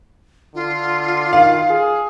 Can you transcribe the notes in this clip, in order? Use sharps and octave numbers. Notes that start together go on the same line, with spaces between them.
D3 F4
D#3 F5
G#4